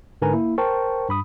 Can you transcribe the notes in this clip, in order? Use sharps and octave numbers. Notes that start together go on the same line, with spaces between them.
G#2 D3 A#4 B4 G#5 A#5
A#3 E4
A#4 C5 G5 A5 C#6
G2 B5 D#6